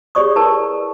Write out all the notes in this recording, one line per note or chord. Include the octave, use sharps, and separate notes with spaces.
G4 G#4 C#5 D5 C#6 D#6
E4 A#4 B4 G5 A5